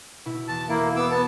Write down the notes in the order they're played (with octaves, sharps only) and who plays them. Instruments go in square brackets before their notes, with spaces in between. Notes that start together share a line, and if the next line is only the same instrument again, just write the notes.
[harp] B2 E4
[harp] E2 [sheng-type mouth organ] A5
[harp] E1 D7 [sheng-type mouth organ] A#3 E4
[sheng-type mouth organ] B3 D6 E6
B3 A5